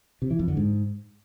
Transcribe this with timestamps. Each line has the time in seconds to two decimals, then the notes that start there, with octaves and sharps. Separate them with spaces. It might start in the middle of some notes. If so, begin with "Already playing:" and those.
0.22 C3
0.30 E3
0.39 F2
0.48 D3
0.57 G#2